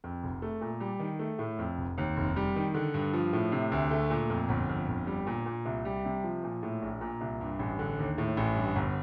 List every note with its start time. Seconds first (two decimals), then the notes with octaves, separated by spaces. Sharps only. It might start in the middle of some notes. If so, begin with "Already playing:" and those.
0.04 F2
0.23 F1
0.42 A3
0.61 A#2
0.80 G3
1.00 D#3
1.19 A3
1.39 A2
1.59 F2
1.78 F1
1.98 D#2
2.16 F1
2.36 G3
2.56 D#3
2.75 D3
2.94 G2
3.13 F3
3.33 A2
3.52 C3
3.72 D2
3.91 A3
4.10 A#2
4.30 F2
4.49 G1
4.69 F2
4.88 G1
5.07 G3
5.27 A#2
5.46 A#2
5.65 C2
5.85 G3
6.05 C3
6.24 F3
6.43 A#2
6.63 A2
6.82 A#1
7.01 A#2
7.21 C2
7.41 G2
7.59 A1
7.79 D3
7.99 D#2
8.18 A2
8.37 A1
8.56 G2
8.76 G1